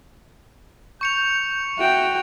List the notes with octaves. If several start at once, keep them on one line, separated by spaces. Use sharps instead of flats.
C#6 G6 C#7 F7
F#4 E5 G5